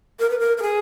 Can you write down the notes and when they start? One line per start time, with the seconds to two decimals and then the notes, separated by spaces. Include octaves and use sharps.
0.19 A#4
0.30 B4
0.39 A#4
0.58 A#4
0.62 G#4